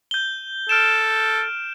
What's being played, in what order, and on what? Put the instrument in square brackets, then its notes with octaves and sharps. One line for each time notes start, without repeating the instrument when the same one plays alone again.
[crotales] G6 G7
[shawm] A4 [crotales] F6 D7 E7